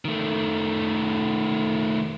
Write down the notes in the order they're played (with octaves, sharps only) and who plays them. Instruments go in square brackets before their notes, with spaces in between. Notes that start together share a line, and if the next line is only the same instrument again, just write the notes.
[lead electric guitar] D#3 A3